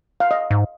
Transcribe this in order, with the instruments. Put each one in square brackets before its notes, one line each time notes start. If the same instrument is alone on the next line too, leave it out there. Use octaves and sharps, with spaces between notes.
[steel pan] F5
D#5
[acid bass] G#2